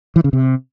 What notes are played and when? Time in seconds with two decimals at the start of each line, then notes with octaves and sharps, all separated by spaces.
0.16 E3
0.24 C#3
0.33 C3